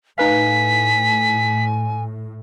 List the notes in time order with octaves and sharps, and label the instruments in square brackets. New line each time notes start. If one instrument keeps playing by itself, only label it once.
[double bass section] A2 [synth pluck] D#4 B4 F5 [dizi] G#5 [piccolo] B6